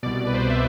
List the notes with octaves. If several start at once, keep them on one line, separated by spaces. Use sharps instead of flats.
C2 B2 D5
B4
C5
D5
E5